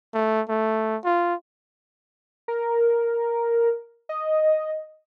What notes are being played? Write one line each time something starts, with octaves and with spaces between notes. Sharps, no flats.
A3
A3
F4
A#4
D#5